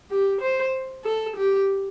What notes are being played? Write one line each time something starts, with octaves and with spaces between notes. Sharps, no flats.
G4
C5
A4
G4